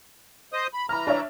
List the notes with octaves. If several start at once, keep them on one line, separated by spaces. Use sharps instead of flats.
C5 D#5 D#6
B5
E3 A#5 B5 F6
D4 C#5 E5